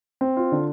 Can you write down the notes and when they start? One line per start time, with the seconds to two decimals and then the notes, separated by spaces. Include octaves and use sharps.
0.21 C4
0.37 F4
0.52 D3